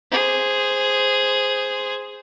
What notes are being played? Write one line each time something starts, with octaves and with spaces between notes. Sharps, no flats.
G#4 C5